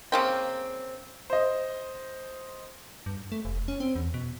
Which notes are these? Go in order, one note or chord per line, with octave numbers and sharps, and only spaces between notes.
C#3 A#3 C4
C5 D#5
G2
A3
F1
C#4
C4
E2
B2